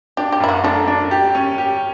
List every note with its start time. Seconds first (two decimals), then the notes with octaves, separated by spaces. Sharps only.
0.17 D4 G4
0.32 G4
0.40 F#2 E4
0.49 F#4
0.64 A3 D4
0.87 D4
1.11 G4
1.35 C#4
1.58 G4